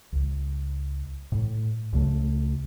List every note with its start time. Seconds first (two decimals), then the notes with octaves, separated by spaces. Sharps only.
0.12 C#2
1.32 A2
1.93 C#2 C#3 A3